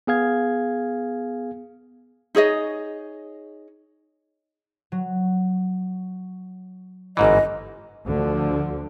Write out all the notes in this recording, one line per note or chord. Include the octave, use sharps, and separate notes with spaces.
B3 G#4 F5 G#6
D#4 G#4 C#5 D#5
F#3
G1 G#2 E3 D#5
D2 D3 F3